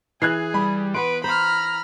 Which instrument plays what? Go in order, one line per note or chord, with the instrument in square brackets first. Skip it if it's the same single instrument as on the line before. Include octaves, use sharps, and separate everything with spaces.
[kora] E3 [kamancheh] G#4 [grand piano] F#6 G#6 C7
[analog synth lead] G3 [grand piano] B5
[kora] B3 F#5 [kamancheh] B4 [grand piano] C6 [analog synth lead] D7
[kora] C5 [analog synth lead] A#5 [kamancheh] B5 F6